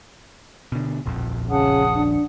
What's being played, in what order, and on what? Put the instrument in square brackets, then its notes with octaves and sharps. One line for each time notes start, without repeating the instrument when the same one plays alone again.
[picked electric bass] B2 D3
D#1 A#1 F2
[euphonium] C#3 [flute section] F#5 A5 D#6
[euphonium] D4